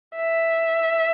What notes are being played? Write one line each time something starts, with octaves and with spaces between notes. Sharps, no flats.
E5